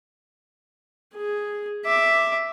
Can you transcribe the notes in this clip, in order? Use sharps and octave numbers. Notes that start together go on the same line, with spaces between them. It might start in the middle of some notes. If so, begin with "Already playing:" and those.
G#4
E5 D6